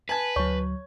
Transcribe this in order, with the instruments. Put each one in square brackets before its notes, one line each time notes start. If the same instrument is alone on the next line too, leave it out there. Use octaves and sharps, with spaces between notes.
[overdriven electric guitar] B4 [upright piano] G#5 A5 G#6
[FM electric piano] D2 F#3 [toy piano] C#5 C#6